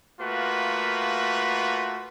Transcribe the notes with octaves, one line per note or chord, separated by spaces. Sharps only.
A3 A#3 F4 F#4 B4